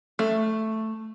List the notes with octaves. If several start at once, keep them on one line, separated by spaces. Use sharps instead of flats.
A3